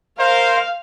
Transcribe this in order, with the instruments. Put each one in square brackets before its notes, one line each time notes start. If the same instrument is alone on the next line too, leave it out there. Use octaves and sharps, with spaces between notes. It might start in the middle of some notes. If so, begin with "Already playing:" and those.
[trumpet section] A#4 C5 [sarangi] F5